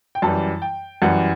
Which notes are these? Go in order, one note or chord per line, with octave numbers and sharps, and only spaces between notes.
G5
F#2 E3 G3 A5
G5
F#2 E3 G3 F#5